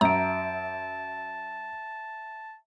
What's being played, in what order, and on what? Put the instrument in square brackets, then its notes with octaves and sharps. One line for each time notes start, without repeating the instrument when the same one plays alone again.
[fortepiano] F#2 [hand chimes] E5 D7 [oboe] A5 [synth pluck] A#5